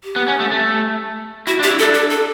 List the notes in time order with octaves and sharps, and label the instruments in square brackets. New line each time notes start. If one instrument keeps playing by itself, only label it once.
[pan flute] G4
[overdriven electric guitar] B3
C#4
A3
A3
[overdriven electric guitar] E4 [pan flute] F#4
[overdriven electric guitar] D4
[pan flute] G4
[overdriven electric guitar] E4
[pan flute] A4
[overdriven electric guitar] D4
[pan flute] A4
A4